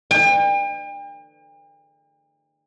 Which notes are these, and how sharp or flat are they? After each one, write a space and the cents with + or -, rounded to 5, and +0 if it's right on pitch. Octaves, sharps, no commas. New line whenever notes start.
G5 +40